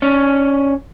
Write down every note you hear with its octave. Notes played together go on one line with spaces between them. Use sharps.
C#4 D4